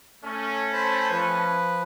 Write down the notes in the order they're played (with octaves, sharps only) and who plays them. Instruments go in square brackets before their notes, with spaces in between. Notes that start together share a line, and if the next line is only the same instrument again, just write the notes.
[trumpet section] A3 C#4
[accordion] C5 A5 B5
F3 B4